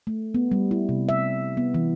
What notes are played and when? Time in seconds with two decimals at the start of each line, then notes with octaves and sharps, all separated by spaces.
0.07 A3
0.34 B3
0.51 G3
0.71 E4
0.89 C3
1.09 E5
1.57 B3
1.74 E3